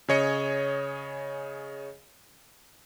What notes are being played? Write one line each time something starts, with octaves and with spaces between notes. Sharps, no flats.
C#3 G#4 C#5 D#5 C#7